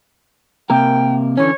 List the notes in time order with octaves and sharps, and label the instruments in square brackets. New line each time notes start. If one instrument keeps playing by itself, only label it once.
[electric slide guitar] C3 A#3 A#4 [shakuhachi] G5
[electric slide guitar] D3 E3 C#4 [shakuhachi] C#5